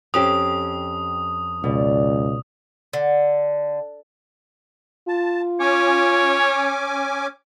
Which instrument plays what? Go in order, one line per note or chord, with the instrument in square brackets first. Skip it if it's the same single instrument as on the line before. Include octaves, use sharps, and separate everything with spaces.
[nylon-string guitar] F2 C#4 G4 [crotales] D#6
[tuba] C#2 [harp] B2 D5
[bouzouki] D3
[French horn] F4 [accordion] A5
[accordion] C#4 G#5 D6 [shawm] C#5